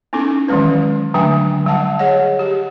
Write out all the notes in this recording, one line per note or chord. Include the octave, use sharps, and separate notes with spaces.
B3 C#4 D#4 E4 A4
D#3 E3 F#3 G#3 C#4 B4
D3 F#3 A3 D4 G5 G#5
G3 D#5 F#5 A5
G#4 C#5 D#5 F#5
G4